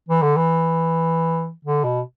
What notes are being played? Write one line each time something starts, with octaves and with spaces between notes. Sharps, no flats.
E3
D3
E3
D3
B2